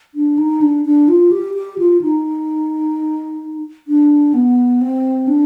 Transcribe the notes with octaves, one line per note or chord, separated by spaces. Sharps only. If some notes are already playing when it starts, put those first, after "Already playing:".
D4
D#4
D4
D4
F4
G4
G4
F4
D#4
D4
B3
C4
D4